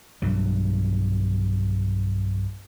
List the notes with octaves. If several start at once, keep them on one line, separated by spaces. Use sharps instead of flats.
B1 G2 F#3